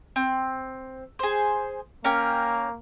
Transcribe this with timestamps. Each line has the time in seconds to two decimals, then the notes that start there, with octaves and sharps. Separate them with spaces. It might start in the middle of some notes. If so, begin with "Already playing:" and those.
0.16 C4
1.19 G#4 C5
2.05 A#3 C#4 A#4 G5